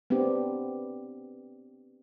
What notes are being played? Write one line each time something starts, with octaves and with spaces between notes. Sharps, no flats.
B3 C4 D4 G4